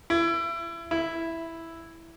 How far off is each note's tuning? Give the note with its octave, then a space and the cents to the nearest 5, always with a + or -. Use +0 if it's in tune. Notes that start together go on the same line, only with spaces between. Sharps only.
E4 +30
E4 +0